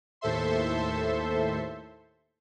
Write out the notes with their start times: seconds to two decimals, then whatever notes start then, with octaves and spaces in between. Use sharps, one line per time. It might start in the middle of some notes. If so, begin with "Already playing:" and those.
0.21 D#2 A2 A4 C5 E5 C6